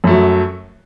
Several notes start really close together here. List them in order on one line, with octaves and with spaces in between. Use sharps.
F#2 A3 F#3